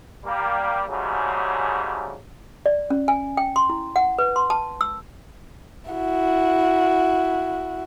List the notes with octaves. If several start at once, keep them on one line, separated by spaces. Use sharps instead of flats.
G3 A#3
G#2 C#3 F#3 G3 A3 A#3
D5
C#4
G#5
G5
C6
E4
F#5
B4
C6
A5
E6
E4 F#4